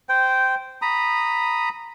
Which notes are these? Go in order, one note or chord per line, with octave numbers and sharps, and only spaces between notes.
C5 G5
A#5 B5 D#6